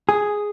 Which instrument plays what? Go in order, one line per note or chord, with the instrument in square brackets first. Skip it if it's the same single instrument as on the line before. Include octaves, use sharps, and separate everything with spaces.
[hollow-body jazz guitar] G#4